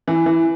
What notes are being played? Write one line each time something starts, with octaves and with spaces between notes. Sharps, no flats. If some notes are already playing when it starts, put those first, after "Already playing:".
E3
E3